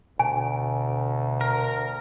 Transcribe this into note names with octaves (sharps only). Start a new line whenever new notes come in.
D2 B2 G#5
A#4